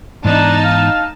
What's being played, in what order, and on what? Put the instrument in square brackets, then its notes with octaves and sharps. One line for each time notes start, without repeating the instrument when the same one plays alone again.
[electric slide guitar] G#2 E3 B3 [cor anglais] D4 [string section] D#4 A5
[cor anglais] F5